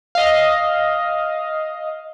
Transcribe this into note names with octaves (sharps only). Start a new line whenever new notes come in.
D#5 F5